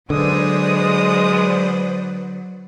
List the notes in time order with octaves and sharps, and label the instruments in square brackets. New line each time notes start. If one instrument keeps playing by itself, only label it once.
[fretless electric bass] D3 [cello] F#3 [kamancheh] G#3 D#6 [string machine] B4 C5 D5